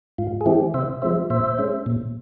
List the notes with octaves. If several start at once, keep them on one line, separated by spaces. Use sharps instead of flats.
G#2 F4
G#4
E3 G#3 C4 E4 G4
C3 C5 E5
F3 G#3 C4 C5 E5
A#2 C5 E5
G#3 C#4
A#2